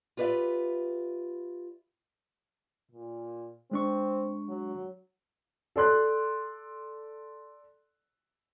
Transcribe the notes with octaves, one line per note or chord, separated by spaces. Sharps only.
F4 G4 B4 C#5 D5 E5
A#2
G#3 C4 D4 C#6
F#3
A4 D5 C6 F#6